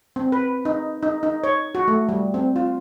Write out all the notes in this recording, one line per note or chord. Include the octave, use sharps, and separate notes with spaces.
C4
B4
D#4
D#4
D#4
C#5
F#4
A3
G3
C4
F4